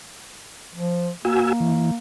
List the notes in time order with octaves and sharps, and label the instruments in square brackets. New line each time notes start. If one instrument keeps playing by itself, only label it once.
[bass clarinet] F3
[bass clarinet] A#3 [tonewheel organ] F#4 G#5 E6
[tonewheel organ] E3